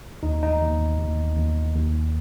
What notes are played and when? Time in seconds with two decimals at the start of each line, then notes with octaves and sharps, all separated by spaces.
0.23 D#2 D#4
0.43 D#4
0.61 D#2
0.99 D#2
1.37 D#2
1.74 D#2